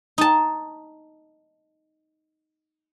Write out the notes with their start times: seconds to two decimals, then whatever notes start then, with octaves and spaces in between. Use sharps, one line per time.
0.18 D#4 A5